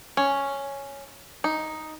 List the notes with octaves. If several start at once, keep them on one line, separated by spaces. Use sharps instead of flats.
C#4
D#4